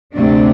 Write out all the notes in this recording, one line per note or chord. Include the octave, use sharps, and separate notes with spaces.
D2 C3 A3 D4